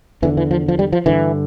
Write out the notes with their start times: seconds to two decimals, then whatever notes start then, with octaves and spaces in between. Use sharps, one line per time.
0.22 E2 D3 E3
0.37 E3
0.51 F3
0.68 F3
0.79 G3
0.93 F3
1.06 G2 D3 E3